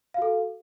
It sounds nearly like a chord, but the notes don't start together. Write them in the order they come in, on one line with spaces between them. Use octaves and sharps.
F5 F#4 A4